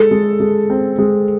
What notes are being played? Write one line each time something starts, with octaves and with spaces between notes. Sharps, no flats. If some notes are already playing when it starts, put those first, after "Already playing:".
Already playing: G#3 A4
G#3
G#3
C4
G#3